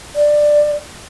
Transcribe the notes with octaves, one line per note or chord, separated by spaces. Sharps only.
D5